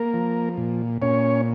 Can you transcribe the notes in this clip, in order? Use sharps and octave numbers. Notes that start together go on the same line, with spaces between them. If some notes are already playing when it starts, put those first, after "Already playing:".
Already playing: A#3 A#4
F3
A#2
A#2 C#4 C#5